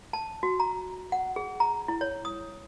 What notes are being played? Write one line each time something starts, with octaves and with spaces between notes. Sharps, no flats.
A5
F#4
A#5
F#5
G#4
A#5
E4
C#5
D#6